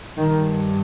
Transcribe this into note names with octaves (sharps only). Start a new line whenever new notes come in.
G2 D#3